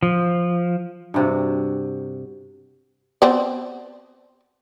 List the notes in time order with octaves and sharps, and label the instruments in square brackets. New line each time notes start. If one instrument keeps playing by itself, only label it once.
[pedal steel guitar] F3
[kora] G2 C3 F#4
[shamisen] B3 C4 D5